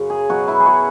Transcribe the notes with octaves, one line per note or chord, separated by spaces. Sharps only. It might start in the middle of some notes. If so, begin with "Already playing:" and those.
Already playing: F#2 C#3
G#4
B2 F#3 F#4
E4
G#4
F#4